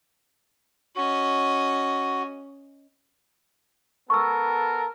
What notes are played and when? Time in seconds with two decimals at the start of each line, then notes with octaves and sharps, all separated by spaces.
0.96 C#4 F#4 D#5
4.10 B3 A4 A#4 C#6 E6